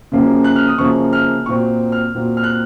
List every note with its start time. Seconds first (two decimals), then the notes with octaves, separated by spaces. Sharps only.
0.12 F#2 C#3 F3 A#3 C#4
0.44 F#6
0.56 F6
0.68 D#6
0.78 F#2 C#3 F3 A#3 C#4 C#6
1.13 F6
1.46 A#2 F#3 C4 C#6
1.92 F6
2.15 A#2 F#3 C4
2.37 F6
2.44 F#6